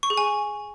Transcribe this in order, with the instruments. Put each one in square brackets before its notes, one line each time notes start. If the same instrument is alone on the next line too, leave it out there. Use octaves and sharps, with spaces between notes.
[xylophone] C#6
G#4
G#5